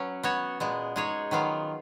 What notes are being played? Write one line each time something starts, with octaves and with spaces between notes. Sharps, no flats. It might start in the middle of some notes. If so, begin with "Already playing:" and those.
Already playing: F#3 C#4 B4
B3 F#4 C#5
A#2 G#3 B3
G#3 D#4 G#4 C#5
D#3 F#3 B3 F4